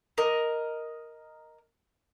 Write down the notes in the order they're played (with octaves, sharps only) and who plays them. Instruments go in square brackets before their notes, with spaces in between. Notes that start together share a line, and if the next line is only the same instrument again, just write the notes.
[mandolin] A#4 D#5